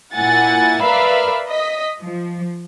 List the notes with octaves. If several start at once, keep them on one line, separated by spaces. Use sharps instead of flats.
A#2 E4 F#5 G#5 A6
A#4 B4 D5 E5 F5 B5
D#5 B6
F3